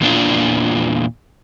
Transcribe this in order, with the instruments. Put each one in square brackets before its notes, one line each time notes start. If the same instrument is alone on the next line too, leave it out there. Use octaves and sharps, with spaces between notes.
[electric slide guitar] E2 A#2 E3 D4 F4